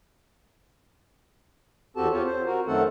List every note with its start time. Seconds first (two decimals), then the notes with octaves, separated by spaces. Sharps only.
1.97 E2 C4 F#4 G4 A4 A5
2.12 C4 F4 G4 C#5
2.26 C5
2.46 F#4 A#4
2.67 F#2 D#3 A3 C4 A4 F#5